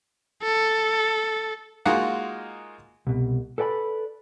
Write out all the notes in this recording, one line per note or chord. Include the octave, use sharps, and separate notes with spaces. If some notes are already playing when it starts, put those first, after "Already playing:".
A4
G#3 A#3 D#4 F4 F#4 F#5
C2 B2
A4 B4 D5 G5 B5